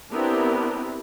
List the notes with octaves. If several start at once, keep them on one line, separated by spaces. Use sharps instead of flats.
B3 C4 D4 E4 G4 A#4